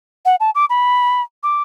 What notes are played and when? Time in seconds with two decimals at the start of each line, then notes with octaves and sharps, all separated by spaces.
0.25 F#5
0.40 A5
0.55 D6
0.70 B5
1.43 D6